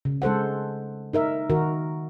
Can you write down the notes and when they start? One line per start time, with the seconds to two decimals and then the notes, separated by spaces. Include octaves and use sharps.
0.05 C#3
0.22 G#3 A4 C5 F#5
1.13 D#4 A#4 E5
1.50 D#3 F#4 A#4